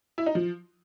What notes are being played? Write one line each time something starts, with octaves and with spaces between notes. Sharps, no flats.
E4
D#4
F3